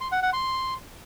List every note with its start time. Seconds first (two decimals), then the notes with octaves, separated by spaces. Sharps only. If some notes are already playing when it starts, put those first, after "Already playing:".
0.01 C6
0.12 F#5
0.22 F#5
0.33 C6